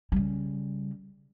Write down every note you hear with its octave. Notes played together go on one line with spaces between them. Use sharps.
C#3 G3